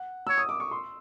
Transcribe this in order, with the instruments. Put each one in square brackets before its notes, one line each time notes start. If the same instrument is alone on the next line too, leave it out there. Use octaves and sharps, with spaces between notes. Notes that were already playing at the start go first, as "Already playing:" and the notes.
Already playing: [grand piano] F#5
[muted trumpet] C#5 [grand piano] E6
[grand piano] D#6
D6
C#6
C6